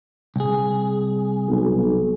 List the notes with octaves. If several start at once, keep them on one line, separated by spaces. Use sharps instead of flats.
C2 G#4
B1